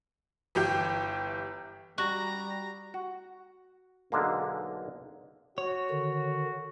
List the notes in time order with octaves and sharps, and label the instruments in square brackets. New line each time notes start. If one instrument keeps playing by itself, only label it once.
[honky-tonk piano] G1 E3 G4 G5
[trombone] G3 [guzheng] F#4 [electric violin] A#5
[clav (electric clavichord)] F#4
B1 D3 G#3 A#3
[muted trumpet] F#4 [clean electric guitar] C#5
[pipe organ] D3 D#3